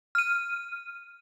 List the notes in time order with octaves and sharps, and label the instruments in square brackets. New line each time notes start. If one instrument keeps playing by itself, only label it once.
[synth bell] F6 D#7